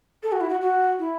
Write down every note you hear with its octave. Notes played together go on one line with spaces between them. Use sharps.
A4
F#4
E4
F#4
F#4
E4